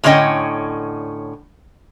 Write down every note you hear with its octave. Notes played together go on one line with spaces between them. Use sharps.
A2 D3 A3 C#4 D#5 G5